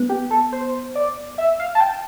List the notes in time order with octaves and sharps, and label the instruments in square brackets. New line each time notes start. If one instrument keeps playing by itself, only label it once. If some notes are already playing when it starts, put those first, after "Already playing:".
Already playing: [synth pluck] B3
[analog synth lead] G4
A4
C5
D5
E5
F5
A5
G5